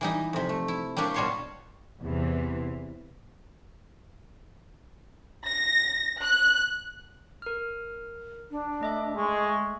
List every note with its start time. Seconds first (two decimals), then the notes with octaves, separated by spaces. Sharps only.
0.01 E3 G3 D#4
0.33 F2 C3
0.49 A3
0.68 E4
0.97 G3 A#3 D4 G4 C#5
1.14 B2 G3 F4 C#5 A5 C6
2.02 E2 C3 E3
5.45 A#6
6.23 F#6
7.42 A#4 F6
8.51 D4
8.81 A3 D#5 E5
9.17 G#3 C#6